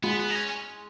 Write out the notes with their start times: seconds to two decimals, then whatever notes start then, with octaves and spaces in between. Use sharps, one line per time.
0.03 G#3 B3
0.19 B3
0.30 D#4
0.35 C#4